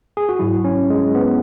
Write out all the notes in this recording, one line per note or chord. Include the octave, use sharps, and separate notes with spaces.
G#4
F#4
G#2 F#3 E4
C#4
G#3
B3